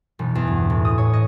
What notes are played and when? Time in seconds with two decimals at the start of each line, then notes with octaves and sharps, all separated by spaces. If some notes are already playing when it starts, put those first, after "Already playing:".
0.19 E1
0.35 E2
0.47 G2
0.70 A2
0.85 D#6
0.98 C#5
1.13 D#5